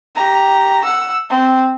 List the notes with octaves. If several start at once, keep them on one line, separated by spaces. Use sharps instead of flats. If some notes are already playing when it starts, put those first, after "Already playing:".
G4 A#5
F#5 E6
C4